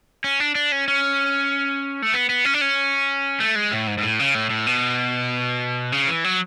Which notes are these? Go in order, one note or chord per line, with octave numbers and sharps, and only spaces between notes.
C#4
D4
D4
C#4
C#4
A3
B3
B3
C#4
D4
C#4
A3
G#3
A2
G#2
G#2
A2
C#3
A2
A2
B2
C#3
E3
F#3